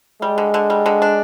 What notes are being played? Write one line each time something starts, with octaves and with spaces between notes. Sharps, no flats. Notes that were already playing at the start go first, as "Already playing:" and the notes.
G3 G#3
D3
D3
G3
D3
D4